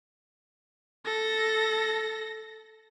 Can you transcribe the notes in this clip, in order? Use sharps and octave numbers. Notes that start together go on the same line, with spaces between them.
A4 A#6